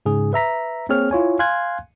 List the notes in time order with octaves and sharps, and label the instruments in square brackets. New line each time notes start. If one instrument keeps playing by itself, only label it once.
[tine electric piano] G#2 C#3 G#4
B4 E5 A#5 B6
A#3 C4 G#4 C#5 F6
E4 F4 C#5 G#5
F5 G#5 C6 F#6 G#6